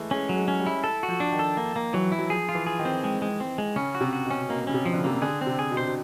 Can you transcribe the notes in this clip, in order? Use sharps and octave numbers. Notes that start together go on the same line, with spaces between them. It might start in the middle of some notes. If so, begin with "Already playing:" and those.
Already playing: E3 G#3 A3
G#3 C#4
F#3
G#3
C#4
G3
E4
A4
F#4
F3
D4
D#3
A4
A#3
A#3
E3 F#3
E4
F#3
F3 G#4
F4
E3
G#4
D#3
C4
G#3
G#3
C4
G#3
C#3 C#4
F#4
C3
F#4
B2 C#4
B2 A#3
C#3 C#4
C3
F3
D3
C#3
C3 A#3
C#3
D3 G#4
C4
C3
G#4
B2
C3 C5
B2